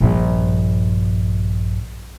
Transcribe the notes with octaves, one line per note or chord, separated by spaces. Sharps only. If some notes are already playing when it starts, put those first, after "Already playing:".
A#1 G2